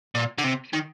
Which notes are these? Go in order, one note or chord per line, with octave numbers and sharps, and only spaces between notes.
A#2
D3
C3
D#3